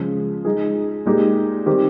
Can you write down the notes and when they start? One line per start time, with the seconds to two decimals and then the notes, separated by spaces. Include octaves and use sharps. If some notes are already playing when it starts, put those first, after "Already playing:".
Already playing: C#3 F3 G#3
0.45 G#3 D#4 G#4
1.05 A#2 G#3 D#4 G4
1.66 D#3 G3 C4 G4